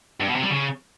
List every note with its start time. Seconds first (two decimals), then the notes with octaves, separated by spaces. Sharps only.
0.20 G2
0.28 B2
0.35 C3
0.43 G3
0.50 C#3